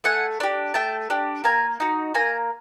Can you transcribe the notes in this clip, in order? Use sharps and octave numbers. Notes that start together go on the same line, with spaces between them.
A3 F#5 G#5
D4 G4
A3 G5 A5
D4 G4
A#3 G#5 A#5
D#4 F#4
A#3 G#5 A#5